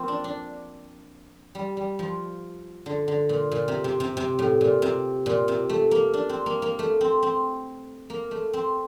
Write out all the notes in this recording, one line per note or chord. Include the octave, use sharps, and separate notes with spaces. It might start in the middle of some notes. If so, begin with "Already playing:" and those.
Already playing: F3 A#3 C4
D4
D4
G3
G3
F3
D3
D3
A#2
A#2
C3
C3
C3
C3
A2
A#2
C3
A#2
C3
A3
A#3
D4
C4
A#3
A#3
A3
C4
C4
A#3
A3
C4